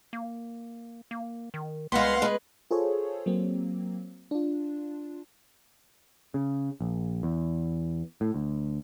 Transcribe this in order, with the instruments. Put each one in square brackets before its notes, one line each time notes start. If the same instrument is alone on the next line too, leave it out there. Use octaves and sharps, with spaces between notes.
[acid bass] A#3
A#3
D#3
[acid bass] C2 [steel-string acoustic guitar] G#3 B3 [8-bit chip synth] F5 F#5 C6
[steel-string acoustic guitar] G#3 B4
[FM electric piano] F4 G#4 A4 C5 C#5
F#3 A#3 C4
D4 F4
[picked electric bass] C#3
A#1
E2
A2
D2